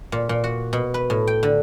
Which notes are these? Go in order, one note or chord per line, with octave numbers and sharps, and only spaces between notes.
A#2
A#2
F#4
B2
B4
A2
G5
D3